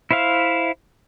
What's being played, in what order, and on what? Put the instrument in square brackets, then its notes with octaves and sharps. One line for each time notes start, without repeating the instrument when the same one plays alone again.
[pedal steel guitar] E4 C5 E5 F5